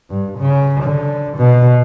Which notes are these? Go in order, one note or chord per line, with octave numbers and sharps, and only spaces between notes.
G2
C#3
D3
B2